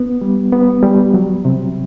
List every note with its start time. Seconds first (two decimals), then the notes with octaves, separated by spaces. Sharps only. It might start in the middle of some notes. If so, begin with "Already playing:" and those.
Already playing: B3
0.21 G3
0.53 B3
0.82 G3
1.14 F#3
1.45 C3